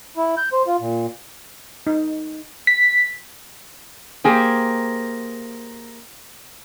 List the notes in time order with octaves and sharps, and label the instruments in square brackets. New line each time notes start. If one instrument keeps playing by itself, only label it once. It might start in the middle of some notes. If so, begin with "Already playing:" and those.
[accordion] E4
G6
C5
F4
A#2
[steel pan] D#4
[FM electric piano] B6
[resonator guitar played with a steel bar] A#3 G4 G#4 C5